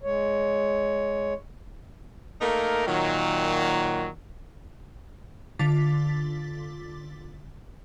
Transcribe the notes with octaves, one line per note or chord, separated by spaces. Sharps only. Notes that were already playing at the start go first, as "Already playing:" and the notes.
G#3 C#5
A3 A#3 D#4 A#4
A#2 D#3 F#3
D3 F4 D6 A6 B6